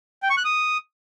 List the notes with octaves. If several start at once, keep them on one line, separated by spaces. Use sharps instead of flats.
G5
C#6
F#6
D#6